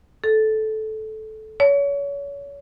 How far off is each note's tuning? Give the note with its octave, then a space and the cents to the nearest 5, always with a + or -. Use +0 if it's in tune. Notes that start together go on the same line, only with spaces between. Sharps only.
A4 -15
C#5 +30